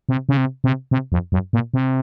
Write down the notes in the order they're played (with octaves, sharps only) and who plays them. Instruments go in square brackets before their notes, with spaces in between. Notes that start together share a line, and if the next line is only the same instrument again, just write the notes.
[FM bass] C3
C#3
C3
C3
C3
F2
F#2
A#2
C3